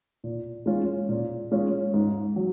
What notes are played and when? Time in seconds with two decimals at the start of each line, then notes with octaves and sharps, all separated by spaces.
0.24 A#2
0.66 G#3 C#4 F4
1.09 A#2
1.52 G#3 C#4 F4
1.94 G#2
2.36 F#3